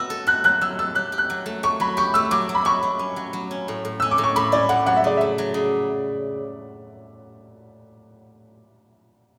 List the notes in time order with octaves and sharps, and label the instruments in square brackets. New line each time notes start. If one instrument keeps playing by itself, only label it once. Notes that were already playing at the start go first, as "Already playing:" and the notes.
Already playing: [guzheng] B3 F#4 [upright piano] E6
[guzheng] A4
[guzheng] F#4 [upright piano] F#6
[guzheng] F#3 [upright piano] F#6
[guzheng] F#3 [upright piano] E6
[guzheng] A4 [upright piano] E6
[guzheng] G4 [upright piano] F#6
[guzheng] G4
[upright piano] F#6
[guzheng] F#3
A3
[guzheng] A3 [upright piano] C#6
[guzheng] F#3 [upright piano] B5
[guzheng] G4 [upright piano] C#6
[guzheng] A3 [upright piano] E6
[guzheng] F#3 [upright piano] D6
[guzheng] F#3
[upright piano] B5
[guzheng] F#3 [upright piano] C#6
[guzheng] F#3
C#4
F#3
F#3
C#4
A2
A2
[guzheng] C#4 [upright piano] E6
[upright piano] D6
[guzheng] A2
[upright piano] C#6
[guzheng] A2 [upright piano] B5
[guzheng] C#4 [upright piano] D5
[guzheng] A2 [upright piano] F#5
[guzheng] F#3 [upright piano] F#5
[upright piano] E5
[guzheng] C#3 [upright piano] D5
[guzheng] A3 [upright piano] E5
[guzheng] F#3
C#3